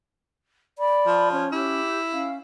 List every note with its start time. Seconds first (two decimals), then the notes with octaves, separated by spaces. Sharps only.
0.79 D5 B5
1.06 F3
1.32 C#4 C#5
1.52 E4 G4
2.13 C#4 F5